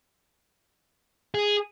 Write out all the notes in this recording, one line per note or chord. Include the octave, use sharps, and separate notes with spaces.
G#4